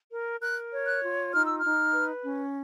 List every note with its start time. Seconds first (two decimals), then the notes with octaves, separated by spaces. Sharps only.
0.11 A#4
0.41 A#4 F#6
0.71 C#5
0.87 F#6
1.03 F4
1.33 D#4 F6
1.46 E6
1.58 F6
1.64 D#4
1.94 B4
2.24 C#4